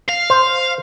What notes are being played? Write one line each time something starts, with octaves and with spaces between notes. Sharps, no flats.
F5
C5